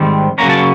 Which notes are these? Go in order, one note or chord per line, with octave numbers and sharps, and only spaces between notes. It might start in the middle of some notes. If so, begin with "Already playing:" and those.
Already playing: G#2 D#3 G3 C4
C#3 F#3 A#3 C#4 A#5
A5